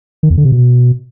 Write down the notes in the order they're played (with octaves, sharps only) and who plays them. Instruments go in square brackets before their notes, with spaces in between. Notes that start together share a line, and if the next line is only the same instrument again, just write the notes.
[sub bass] D#3
E2
D3
C3
B2